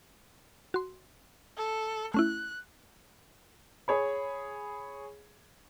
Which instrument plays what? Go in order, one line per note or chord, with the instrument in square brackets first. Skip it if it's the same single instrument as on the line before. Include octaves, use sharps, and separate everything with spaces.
[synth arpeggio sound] F#4 C6
[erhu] A4
[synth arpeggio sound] A3 C#4 E4 [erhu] F#6
[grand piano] G#4 C#5 B5